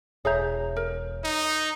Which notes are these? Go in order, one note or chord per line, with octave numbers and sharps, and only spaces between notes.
E1 G#4 C#5 E5 A#5 G6
A#4
D#4